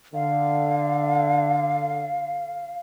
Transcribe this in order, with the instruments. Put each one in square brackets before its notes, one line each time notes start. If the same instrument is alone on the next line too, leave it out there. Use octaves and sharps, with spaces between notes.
[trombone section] D3 [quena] F5